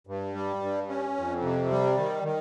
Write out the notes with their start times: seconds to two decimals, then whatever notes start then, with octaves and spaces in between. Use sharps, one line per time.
0.07 G2
0.34 G3
0.61 G2
0.88 C#4
1.16 F2
1.42 C3
1.70 G3
1.97 D#3
2.23 D#3